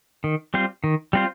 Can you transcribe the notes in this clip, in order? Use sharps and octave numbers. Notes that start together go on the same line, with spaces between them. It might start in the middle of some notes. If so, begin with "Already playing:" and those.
D#3
G3 C4 F4 C5
D#3
G3 C4 F4 C5